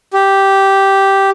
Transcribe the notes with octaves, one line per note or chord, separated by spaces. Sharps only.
G4